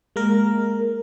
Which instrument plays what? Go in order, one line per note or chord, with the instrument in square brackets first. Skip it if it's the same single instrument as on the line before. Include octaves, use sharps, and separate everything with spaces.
[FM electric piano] G#3 A#3 A#4